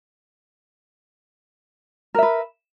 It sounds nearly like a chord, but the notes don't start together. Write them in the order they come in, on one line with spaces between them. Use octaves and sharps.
A#4 E5 B4